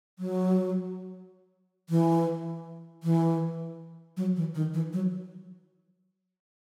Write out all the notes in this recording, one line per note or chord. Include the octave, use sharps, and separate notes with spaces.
F#3
E3
E3
F#3
E3
D#3
E3
F#3